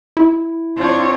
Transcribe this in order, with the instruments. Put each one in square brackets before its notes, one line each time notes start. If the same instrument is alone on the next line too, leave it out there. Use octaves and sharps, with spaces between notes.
[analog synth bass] E4
[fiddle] C4 D4 [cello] F4 C#5